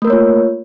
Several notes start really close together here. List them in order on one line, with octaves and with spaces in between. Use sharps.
A3 A#4 A#3 C#5 F4